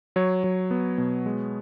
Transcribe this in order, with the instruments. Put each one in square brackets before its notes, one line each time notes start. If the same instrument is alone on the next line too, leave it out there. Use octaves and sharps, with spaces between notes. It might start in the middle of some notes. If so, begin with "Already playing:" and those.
[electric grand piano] F#3 C#5
F#3
B3
B2
G#3